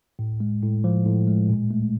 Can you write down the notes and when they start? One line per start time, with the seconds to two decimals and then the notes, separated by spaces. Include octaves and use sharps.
0.19 A2
0.40 G#3
0.62 A2
0.84 F3
1.06 A2
1.27 G#3
1.49 A#2
1.71 A3